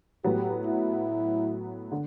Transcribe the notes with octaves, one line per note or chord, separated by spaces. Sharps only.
A2 F#3 B3 G4
E4
D3